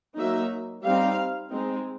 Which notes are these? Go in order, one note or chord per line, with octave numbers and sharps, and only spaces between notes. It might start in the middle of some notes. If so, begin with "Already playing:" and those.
F#3 A#3 D#4 E5
G3 C4 D#4 F5
G#3 C4 D#4